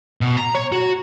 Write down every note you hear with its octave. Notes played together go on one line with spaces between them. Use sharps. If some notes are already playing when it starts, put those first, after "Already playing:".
B2
A#5
C#5
F#4